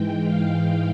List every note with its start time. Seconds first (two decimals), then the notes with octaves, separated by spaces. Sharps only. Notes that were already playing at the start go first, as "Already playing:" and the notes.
Already playing: G#2 E3 G#3 G5
0.23 F5